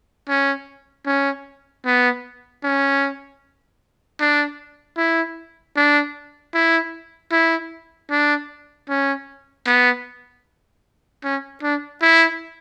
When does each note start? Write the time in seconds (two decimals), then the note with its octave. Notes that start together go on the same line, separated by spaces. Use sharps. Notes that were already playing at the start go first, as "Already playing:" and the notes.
0.29 C#4
1.06 C#4
1.85 B3
2.64 C#4
4.20 D4
4.97 E4
5.76 D4
6.54 E4
7.32 E4
8.11 D4
8.89 C#4
9.67 B3
11.24 C#4
11.63 D4
12.02 E4